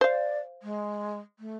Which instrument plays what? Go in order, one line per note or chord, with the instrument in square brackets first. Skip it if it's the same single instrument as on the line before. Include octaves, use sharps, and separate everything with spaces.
[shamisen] C5 F5 [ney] D5
[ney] G#3
A3